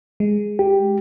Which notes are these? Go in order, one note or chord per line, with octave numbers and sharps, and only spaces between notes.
G#3
G4